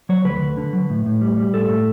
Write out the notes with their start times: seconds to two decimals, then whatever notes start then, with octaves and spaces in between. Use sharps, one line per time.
0.09 F#3 C#5
0.25 D2 B4
0.41 D2
0.57 D3
0.73 F#3
0.90 A2
1.06 A2
1.21 G3
1.37 G3
1.53 A2 A4
1.69 A2